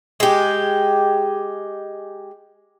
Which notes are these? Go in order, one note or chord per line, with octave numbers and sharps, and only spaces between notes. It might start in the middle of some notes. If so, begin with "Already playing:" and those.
G#3 G4